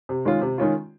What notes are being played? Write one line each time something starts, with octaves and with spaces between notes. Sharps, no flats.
C3
D#3 G#3 C#4 F4
C3
D#3 G#3 C#4 F4